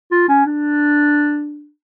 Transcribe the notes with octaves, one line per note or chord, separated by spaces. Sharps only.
F4
C#4
D4